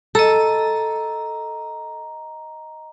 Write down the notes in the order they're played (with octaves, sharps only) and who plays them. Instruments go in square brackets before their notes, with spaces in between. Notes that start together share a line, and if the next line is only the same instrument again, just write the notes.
[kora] A4 [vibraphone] D#5 A#5